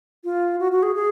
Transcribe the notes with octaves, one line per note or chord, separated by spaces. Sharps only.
F4
F#4
F#4
G#4
G#4